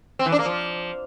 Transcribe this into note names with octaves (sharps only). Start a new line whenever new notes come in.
C4
E3
D4
A#3
F3